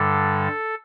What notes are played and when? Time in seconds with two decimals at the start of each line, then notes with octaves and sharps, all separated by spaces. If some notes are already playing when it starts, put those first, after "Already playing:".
Already playing: G2 D3 G3 A4